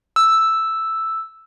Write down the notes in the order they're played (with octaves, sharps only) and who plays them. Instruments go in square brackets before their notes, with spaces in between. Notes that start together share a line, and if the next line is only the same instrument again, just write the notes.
[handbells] E6